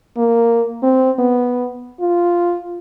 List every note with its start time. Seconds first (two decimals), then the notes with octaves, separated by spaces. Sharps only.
0.17 A#3
0.83 C4
1.19 B3
2.00 F4